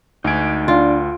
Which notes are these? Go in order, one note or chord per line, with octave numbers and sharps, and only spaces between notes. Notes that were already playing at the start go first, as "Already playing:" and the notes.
D2 D#4 G#5 D7
D4 F4